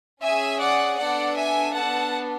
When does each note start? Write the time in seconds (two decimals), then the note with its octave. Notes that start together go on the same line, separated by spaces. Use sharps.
0.22 C#4 G#4 E5 G#5
0.61 D5 F#5
0.99 B3 D4 A4 D5 F#5
1.37 E5 G#5
1.75 B3 D4 A4 F#5 A5